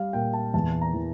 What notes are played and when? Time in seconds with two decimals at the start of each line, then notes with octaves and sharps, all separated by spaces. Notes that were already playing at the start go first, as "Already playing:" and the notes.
Already playing: G3 F5
0.13 A#2 G5
0.33 A5
0.54 E2 A5
0.81 A#5
0.94 E3